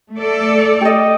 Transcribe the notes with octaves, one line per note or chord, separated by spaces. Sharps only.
A3 A4 D5
G4 D#5